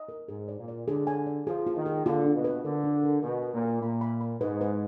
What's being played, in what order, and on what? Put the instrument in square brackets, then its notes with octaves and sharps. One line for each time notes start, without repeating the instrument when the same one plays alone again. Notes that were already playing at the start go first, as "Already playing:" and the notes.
Already playing: [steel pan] D#5
A#4
[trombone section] G#2 [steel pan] G#4
[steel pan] D5
[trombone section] A#2
[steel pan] D5
[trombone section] D3 [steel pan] G#4
[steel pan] G#5
D5
[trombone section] F3 [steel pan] G#4
[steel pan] F4
[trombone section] D#3
[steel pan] G#4
[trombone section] D3 [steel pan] F4
[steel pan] D4
[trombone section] B2
[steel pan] B4
[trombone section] D3 [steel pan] A#4
[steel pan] D4
A#4
[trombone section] B2 [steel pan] A#4
[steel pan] A#4
[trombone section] A#2
[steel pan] A#4
[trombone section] A#2 [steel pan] B5
[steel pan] B5
B5
[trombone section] G#2 [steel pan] B4
[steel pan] B4